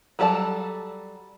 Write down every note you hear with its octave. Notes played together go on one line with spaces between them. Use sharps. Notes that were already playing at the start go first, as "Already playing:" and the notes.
F#3 G3 A4 D5 A5